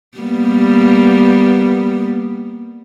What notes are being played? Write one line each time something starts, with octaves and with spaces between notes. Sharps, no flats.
G3 A#3 B3